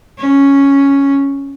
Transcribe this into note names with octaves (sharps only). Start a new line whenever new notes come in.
C#4